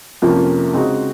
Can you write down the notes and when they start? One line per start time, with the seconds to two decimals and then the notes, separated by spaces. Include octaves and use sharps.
0.22 F2 C3 F3 A#3 C#4
0.74 C#3 G#3 C4 D#4 F#4